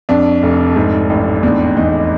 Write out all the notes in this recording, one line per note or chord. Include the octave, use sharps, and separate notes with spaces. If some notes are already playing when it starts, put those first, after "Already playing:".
F2 D4
F1
G#2
A1
E2 D4
E2 D#4